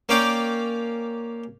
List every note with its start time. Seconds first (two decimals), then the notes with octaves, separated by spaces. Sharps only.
0.09 A#3 C#4 D5 F5 G5 D6